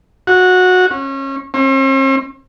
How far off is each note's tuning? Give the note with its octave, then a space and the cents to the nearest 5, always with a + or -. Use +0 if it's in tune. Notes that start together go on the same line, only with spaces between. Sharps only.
F#4 -15
C#4 -25
C4 +45